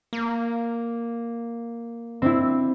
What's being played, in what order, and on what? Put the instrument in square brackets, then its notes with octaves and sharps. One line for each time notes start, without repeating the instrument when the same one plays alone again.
[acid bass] A#3
[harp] C4 D4 E4